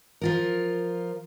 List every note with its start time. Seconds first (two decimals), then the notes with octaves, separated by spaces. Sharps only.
0.21 F3 F4 A#4